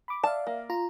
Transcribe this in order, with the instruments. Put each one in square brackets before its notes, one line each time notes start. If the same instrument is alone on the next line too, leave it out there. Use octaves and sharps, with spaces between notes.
[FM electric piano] B5 D6
[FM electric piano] D5 E5 F5 [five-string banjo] A5
[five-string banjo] A#3
[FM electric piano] F4 A#5